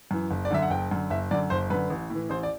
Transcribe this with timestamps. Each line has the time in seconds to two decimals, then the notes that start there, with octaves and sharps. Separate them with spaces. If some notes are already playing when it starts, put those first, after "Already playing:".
0.11 F#2 E3
0.31 F#1
0.45 D5
0.51 F#2 D3 E5
0.62 F#5
0.70 F#1 G5
0.91 F#2 D3
1.10 F#1 E5
1.31 F#2 D3 D5
1.50 F#1 C5
1.70 F#2 D3 B4
1.90 A1
2.10 A2
2.15 E3
2.29 A1 C5
2.43 D5